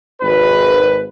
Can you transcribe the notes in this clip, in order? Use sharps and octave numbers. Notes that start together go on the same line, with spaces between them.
G#1 B4